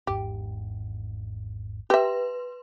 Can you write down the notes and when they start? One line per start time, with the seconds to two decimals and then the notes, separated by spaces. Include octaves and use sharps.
0.07 G#1 E2 G#2 G4
1.90 G4 B4 E5 C6